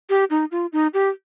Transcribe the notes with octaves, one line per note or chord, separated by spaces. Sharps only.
G4
D#4
F4
D#4
G4